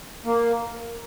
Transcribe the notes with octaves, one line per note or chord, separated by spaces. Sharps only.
A#3